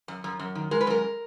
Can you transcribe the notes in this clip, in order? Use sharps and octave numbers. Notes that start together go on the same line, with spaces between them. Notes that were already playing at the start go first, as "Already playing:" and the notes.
F#2
F#2
F#2
D#3
G#3 A#4
B4
F#2 A#4